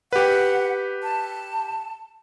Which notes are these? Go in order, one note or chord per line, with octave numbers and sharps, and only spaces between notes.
G4 B4 F#5
A5